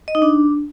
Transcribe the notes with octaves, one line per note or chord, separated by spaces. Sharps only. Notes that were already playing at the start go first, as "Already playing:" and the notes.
D#5
D#4
D4